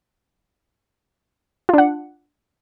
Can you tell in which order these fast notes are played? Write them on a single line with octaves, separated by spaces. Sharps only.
F4 D4 F#5